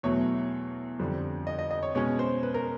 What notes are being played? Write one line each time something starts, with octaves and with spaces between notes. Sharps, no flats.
E2 B2 F#3 A3 C#5
F2 D3 G3
D#5
D#5
D#5
C#5
B2 G#3 C#4 C#5
C5
B4
A#4